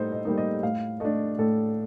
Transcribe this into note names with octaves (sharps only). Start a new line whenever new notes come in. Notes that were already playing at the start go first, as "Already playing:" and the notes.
Already playing: A2 G3 D#4 A4 C5
D#5
G3 A#3 D#4
D#5
A2 F5
A3 D4 D#5
A2 A4